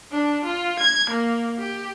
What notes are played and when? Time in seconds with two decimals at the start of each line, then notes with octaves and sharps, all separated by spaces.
0.11 D4
0.45 F4
0.80 G#6
1.10 A#3
1.59 G4